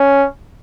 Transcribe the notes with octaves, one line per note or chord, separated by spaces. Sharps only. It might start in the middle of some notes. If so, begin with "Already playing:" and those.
Already playing: C#4